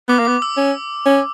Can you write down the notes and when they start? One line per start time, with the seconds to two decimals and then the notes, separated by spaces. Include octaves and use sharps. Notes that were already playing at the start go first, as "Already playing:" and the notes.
0.08 B3 D6
0.19 A#3
0.25 B3 D6
0.42 E6
0.57 C#4
1.06 C#4